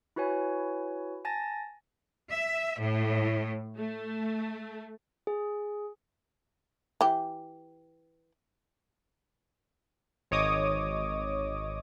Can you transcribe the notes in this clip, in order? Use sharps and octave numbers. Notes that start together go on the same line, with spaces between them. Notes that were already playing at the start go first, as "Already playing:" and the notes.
E4 F#4 B4 C#5 G#5
G#5 A5 A6 A#6
E5
A2
A3
G#4
E3 G4
G#1 C#5 D#5 D6 D#6